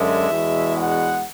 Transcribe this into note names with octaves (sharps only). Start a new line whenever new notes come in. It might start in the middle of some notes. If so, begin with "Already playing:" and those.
Already playing: F#2 D3 G#3 E5
E2 B2 G#3
F#5